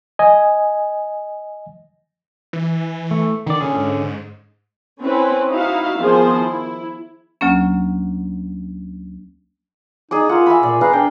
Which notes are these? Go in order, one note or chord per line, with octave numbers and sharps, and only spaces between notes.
D#5 G#5
E3
A3
D3 D#3 D5
A#2 D3 C#4 G#4
G#2
C4 C#4 E4 B4
D#4 E4 F#4 E5 F5
D#3 F3 B3 C4 G#4 C5
E4
D2 F#3 A#3 C#4
D#4 G#4 D5 D6
F4 G#4 A#4 F#5
E5 G#5 B5
A#2 D5
G#4 B4 F5 A#5
D4 G5